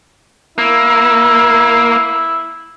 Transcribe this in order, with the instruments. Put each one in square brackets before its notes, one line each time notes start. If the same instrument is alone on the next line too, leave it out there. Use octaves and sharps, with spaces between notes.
[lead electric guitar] A#3 [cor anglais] E4